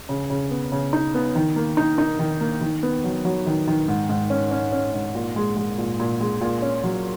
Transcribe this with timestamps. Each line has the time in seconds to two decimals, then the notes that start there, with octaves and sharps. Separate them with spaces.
0.09 C#3
0.30 C#3
0.51 B3
0.72 C#3
0.93 D#4
1.14 B3
1.35 D#3
1.56 A#3
1.77 D#4
1.98 D#4
2.19 D#3
2.41 A#3
2.61 D#3
2.83 B3
3.04 F#3
3.25 F#3
3.46 D#3
3.67 D#3
3.88 G#2
4.09 G#2
4.30 C#4
4.51 C#4
4.72 C#4
4.93 G#2
5.15 A#2
5.36 G#3
5.57 G#3
5.78 A#2
6.00 A#2
6.21 G#3
6.41 A#2
6.62 C#4
6.83 F#3